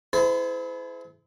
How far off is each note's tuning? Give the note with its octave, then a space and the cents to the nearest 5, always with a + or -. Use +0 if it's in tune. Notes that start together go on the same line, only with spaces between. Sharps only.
E4 +0 A4 -45 C5 -35